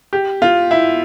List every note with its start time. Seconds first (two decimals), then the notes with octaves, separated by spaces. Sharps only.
0.13 G4
0.42 F4
0.71 E4